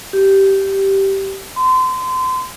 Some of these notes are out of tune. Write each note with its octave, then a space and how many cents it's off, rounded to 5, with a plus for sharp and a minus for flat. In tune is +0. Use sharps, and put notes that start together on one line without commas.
G4 -10
C6 -30